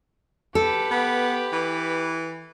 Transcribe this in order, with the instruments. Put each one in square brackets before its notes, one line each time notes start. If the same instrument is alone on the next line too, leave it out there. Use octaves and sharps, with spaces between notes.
[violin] G4 B4 [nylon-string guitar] A4
[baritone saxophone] B3
E3